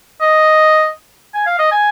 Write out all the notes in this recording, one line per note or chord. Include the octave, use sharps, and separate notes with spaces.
D#5
G#5
F5
D#5
G#5